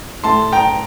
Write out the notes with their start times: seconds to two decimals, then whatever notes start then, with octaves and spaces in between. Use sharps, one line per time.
0.24 A2 A3 A5 C6
0.53 G5 A#5